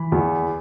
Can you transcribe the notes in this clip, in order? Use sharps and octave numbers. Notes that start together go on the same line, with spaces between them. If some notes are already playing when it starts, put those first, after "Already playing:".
Already playing: E3 B5
E2